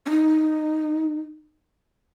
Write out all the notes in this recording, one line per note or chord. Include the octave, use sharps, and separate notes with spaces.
C#4
D#4